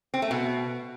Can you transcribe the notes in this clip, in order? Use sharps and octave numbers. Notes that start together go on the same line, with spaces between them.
C4
A3
B2